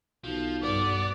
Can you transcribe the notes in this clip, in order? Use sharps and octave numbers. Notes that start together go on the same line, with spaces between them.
B1 F3
G2 B3 D5